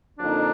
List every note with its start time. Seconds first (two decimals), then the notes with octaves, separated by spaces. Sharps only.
0.19 F2 D3 F3 A#3 D4 D#4